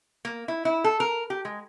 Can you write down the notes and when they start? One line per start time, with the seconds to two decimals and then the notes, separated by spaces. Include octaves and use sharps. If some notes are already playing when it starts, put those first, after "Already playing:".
0.25 A#3
0.48 E4
0.65 E4
0.84 A4
1.00 A#4
1.30 G4
1.45 G#3